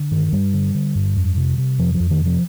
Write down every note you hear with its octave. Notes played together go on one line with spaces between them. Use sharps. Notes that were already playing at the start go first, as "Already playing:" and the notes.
Already playing: D3
G2 D#3
G2 G3
D3
D3
G2
F2
C3
C3
F2 F3
F3
F2
D#3
C3 F3